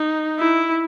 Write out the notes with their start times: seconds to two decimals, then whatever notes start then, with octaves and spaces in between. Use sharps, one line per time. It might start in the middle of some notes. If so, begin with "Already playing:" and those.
Already playing: D#4
0.39 E4